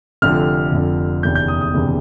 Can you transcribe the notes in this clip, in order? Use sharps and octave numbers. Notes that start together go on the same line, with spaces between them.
F1 F2 D3 F3 F6
F1 F2 D3 F3
F#1 E2 C3 D#3 G6
G6
D#6
D#6
F#1 E2 C3 D#3